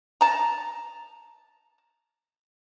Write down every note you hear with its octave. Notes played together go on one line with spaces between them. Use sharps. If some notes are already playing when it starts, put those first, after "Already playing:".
A5 A#5